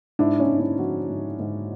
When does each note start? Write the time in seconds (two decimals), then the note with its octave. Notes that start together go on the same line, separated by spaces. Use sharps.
0.19 G#2 D4 E4
0.39 C#4 D#4
0.50 G#2
0.59 D4 E4
0.79 F3 E4 F#4
1.09 G#2
1.39 G#2